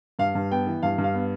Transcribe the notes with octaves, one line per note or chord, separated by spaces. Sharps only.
G2 F5
G2
B3 G5
E3
G2 F5
G2
F5
B3